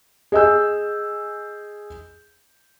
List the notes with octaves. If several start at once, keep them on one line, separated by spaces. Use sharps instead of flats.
G#4 D#5 G#5 E6 G6